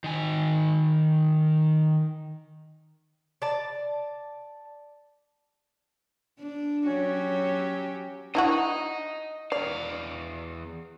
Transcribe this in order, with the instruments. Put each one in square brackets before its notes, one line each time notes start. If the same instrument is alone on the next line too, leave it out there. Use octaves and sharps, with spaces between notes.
[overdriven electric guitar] D#3 G#5
[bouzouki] D5 A5
[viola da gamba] D4
[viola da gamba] F#3 F#4 G4 [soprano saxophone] C#4
[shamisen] D4 E4 F#4 [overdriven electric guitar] D#5 A#5
[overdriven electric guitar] E2 F5 [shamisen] D5